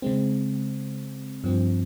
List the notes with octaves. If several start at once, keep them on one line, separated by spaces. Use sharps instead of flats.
C#3 G#3 C4
G2 F3 C4